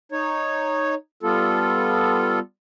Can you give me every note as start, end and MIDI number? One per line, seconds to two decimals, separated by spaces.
0.12 0.95 63
0.12 0.95 73
1.23 2.39 55
1.23 2.39 59
1.23 2.39 65
1.23 2.39 69